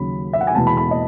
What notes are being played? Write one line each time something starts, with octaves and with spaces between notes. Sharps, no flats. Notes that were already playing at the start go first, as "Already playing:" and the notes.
Already playing: D#2 C#3 F#3 B5
E5
F#5
G#5
E2 B2 G#3 B3 A5
B5
B5
D#5